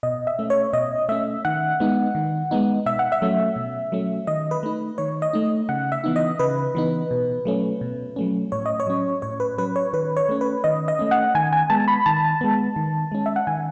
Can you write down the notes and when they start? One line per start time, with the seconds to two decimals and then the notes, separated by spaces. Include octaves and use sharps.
0.03 B2 D#5
0.27 E5
0.39 A3 C#4
0.50 C#5
0.73 B2 D#5
1.09 A3 C#4 E5
1.45 D#3 F#5
1.80 G#3 B3 D#4
2.15 D#3
2.51 G#3 B3 D#4
2.86 B2 E5
2.99 F#5
3.12 E5
3.22 F#3 A3 C#4
3.56 B2
3.92 F#3 A3 C#4
4.27 D#3 D#5
4.51 B4
4.63 A3 D#4
4.98 D#3 C#5
5.22 D#5
5.33 A3 D#4
5.69 C#3 F#5
5.92 E5
6.04 E3 B3 D#4
6.16 D#5
6.39 C#3 B4
6.75 E3 B3 D#4
7.11 B2
7.45 F#3 A3 C#4
7.81 B2
8.16 F#3 A3 C#4
8.52 A2 C#5
8.66 D#5
8.80 C#5
8.87 F#3 C#4
9.22 A2 C#5
9.40 B4
9.58 F#3 C#4 B4
9.76 C#5
9.93 D#3 B4
10.17 C#5
10.29 A3 C#4
10.41 B4
10.64 D#3 D#5
10.88 D#5
10.99 A3 C#4
11.11 F#5
11.35 D#3 G#5
11.53 G#5
11.70 G#3 B3 A5
11.88 B5
12.06 D#3 A5
12.41 G#3 B3
12.76 D#3
13.11 G#3 C#4
13.26 E5
13.36 F#5
13.47 D#3 G#5